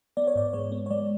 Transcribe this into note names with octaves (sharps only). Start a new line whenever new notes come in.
B3 D5
C#5
G#2 D5
G#3 C#5
B3
C#5
G#3 D5